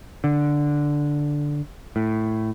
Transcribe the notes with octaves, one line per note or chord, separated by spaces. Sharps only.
D3
A2